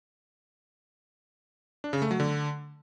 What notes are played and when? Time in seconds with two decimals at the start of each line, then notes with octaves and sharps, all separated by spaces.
1.84 D4
1.93 C#3
2.02 A3
2.11 F#3
2.20 D3